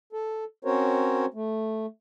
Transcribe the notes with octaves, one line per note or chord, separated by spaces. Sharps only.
A4
C4 C#4 F#4 A#4 C5 C#5
A3